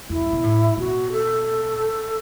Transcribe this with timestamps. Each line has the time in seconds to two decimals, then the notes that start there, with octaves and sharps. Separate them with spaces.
0.10 F#2 E4
0.21 G2
0.32 B2
0.43 A2
0.77 B2 F#4
1.12 A4